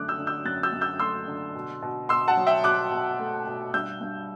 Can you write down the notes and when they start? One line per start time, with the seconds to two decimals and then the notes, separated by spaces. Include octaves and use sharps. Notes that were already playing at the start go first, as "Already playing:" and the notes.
Already playing: F#2 D3 A3 D6 F#6
0.08 E6 G6
0.18 D3
0.27 E6 G6
0.45 F#2 F#6 A6
0.63 E6 G6
0.73 F#2
0.81 E6 G6
1.00 A3 C6 E6
1.28 D3
1.55 B2
1.82 B2
2.09 B2 C6 E6
2.28 F#5 A5
2.37 F#3
2.47 E5 G5
2.64 B2 D6 F#6
2.91 B2
3.19 A3
3.46 B2
3.74 G2 E6 G6
4.01 G2